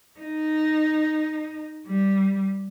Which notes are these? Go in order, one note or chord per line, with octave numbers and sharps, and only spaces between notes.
D#4
G3